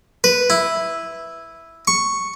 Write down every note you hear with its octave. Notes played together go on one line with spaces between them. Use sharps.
B4
E4
C#6